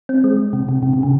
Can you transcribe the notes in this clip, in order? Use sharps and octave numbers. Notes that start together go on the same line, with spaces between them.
C4
G#3
C3
C3
C3
C3
C#3